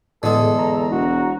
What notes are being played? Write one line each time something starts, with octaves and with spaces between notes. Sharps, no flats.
E2 A2 D3 G#3 A4
A#5
E1 F#4